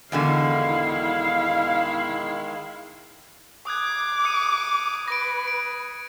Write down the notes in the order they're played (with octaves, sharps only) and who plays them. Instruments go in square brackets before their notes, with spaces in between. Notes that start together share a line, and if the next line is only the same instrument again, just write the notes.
[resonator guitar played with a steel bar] E2 B2 D3 [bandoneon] D#3 G#3 [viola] E4 [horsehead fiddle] F5
[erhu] D6 [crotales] D#6 F#6 G#6
[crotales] D#6 C#7 D#7
[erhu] B4 [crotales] A#6 D7
[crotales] D7